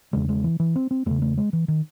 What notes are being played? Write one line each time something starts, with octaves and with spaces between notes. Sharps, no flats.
E2 C#3 G#3
G#3
E3
E3
C4
C4
E2 C#3 A3
A3
G#3
E3
D#3